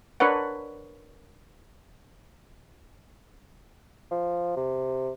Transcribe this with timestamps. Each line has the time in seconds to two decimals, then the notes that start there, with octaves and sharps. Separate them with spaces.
0.20 D4 A#4 B4 C#5 F#5
4.11 F3
4.56 C3